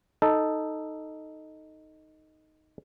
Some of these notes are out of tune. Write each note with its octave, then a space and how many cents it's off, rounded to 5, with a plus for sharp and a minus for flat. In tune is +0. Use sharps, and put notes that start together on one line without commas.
D#4 +0 A4 +0